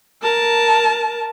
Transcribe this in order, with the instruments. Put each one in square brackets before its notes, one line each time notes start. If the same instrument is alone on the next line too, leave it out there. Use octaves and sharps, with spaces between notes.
[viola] A#4 A5